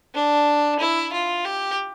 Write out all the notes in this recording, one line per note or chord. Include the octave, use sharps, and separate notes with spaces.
D4
E4
F4
G4